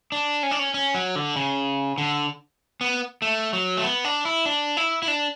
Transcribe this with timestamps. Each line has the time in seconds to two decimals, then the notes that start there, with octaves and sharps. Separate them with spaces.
0.12 D4
0.43 C#4
0.51 D4
0.59 C#4
0.74 C#4
0.94 F#3
1.16 D3
1.36 C#3
1.98 D3
2.81 B3
3.22 A3
3.53 F#3
3.77 A3
3.84 B3
4.05 D4
4.25 E4
4.46 D4
4.77 E4
5.03 E4
5.08 D4